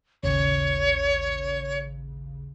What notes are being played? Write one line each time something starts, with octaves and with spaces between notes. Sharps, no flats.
A1 D#2 C#3 C#5